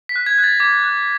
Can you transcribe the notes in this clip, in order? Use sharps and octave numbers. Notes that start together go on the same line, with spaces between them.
B6
F#6
G#6
F#6
A6
D6 G#6
F#6